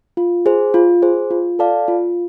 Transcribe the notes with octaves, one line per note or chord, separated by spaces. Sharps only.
F4
G#4 C5
F4
G#4 C5
F4
A4 D5 F5 A5
F4